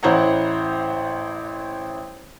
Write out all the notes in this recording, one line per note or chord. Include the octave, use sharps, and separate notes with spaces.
A1 E4 C5 C#5 F#5 A#5